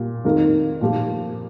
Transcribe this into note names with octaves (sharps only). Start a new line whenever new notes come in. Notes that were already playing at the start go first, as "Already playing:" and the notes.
Already playing: A#2 G3
F2 D#3 A#3 D#4 A#4
A#2 F3 A#3 G4